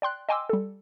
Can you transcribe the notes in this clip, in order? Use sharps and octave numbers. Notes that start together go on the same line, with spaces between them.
D5 G5 C6 F#6
D#5 G5 G#5 C6 D6 E6
G3 A4